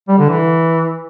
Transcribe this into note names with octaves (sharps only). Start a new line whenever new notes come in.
G3
D3
E3